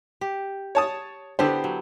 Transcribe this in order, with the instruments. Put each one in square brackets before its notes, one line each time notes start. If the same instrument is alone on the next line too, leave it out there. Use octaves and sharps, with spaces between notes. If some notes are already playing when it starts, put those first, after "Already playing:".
[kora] G4
[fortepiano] C#5 A5 D#6
[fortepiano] D3 C5 [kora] B3 E4 G4
[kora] F#3